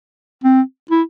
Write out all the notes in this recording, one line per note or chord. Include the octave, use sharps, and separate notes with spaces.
C4
E4